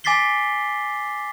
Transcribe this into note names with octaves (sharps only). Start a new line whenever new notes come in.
G#5 D6 A6 B6 C7 G7